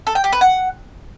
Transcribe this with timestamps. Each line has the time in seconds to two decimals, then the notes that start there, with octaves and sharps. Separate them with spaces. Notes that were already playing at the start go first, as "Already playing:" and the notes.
0.07 A4
0.15 G5
0.24 G4
0.32 B4
0.41 F#5